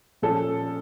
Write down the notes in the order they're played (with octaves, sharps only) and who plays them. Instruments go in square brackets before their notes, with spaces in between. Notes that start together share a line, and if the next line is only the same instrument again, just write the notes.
[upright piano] A#2 F3 C#4 A4